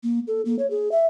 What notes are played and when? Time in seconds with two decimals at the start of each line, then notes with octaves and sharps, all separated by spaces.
0.03 A#3
0.27 A4
0.45 A#3
0.59 C#5
0.70 G#4
0.92 E5